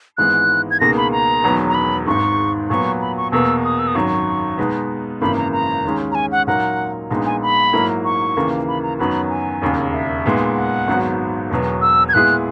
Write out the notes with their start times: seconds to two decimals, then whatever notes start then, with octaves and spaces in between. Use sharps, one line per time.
0.17 G#1 G#2 E3 G#3 B3 F#6
0.71 G#6
0.80 C#2 B2 A#3 D#4 G#4 A#6
0.97 B5
1.12 A#5
1.44 E1 E2 D#3 F#3 B3
1.68 A#5
1.74 B5
2.06 G#1 G#2 D#3 C#6
2.70 A#2 F#3 B3 C#6
3.01 B5
3.17 C#6
3.32 E2 B2 A#3 E6
3.64 D#6
3.79 E6
3.87 D#6
3.95 G#1 F#2 D#3 F#3 C#6
4.58 B2 G#3 B3 D#4
5.21 G#1 F#2 C#3 E3 A#3 B5
5.37 A#5
5.52 A#5
5.85 D#2 D#3 G#3 C#4
6.12 A#5
6.15 G#5
6.32 F#5
6.47 A#2 F#3 A#3 D#4 A#4 F#5
7.10 A#1 A#2 G#3 B3 D#4
7.26 G#5
7.42 B5
7.73 G#2 F#3 A#3 E4 A#4
8.05 C#6
8.36 D#2 C#3 E3 A#3
8.68 B5
8.83 A#5
8.99 F#2 D#3 F#3 B3 F#4 B5
9.30 G#5
9.62 E1 D#2 C#3
9.93 E5
10.25 A#2 G#3 B3 D#4
10.56 F#5
10.88 G#1 G#2 F#3 B3 F#4
11.50 E1 E2 B2 F#3 B3
11.81 E6
12.09 G#6
12.13 A#2 G#3 B3 E4 G#4 F#6